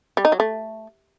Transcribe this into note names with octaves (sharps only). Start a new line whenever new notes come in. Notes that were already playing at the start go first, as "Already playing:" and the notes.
G3
D#4
F#3
A3